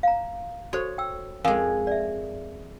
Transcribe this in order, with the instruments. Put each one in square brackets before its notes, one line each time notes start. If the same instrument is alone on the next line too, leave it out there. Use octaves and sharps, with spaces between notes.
[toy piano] F5 A#5
[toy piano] F#4 A4 C5 [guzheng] C#5
[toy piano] G5 E6
[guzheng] F2 G#3 [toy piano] A#4 F5 G#5
[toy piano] D5 E5